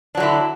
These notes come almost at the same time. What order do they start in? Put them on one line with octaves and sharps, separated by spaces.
D4 F#3 D3 E4